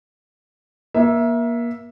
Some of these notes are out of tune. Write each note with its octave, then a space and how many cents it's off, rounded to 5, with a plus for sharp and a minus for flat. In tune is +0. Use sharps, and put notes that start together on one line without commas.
A#3 +30 E5 +0